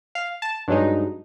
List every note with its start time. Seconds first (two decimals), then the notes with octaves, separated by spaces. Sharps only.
0.15 F5
0.42 A5
0.68 G2 F#3 G#3 D#4